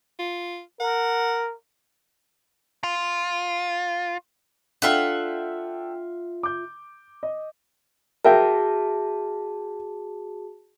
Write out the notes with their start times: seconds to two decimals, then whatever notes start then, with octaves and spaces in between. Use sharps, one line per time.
0.19 F4
0.80 A#4 F#5
2.84 F4
4.82 D4 F4 A4 E5 F#5 G5
6.43 D6 G6
7.23 D#5
8.25 F#4 G#4 A#4 E5 G5 A5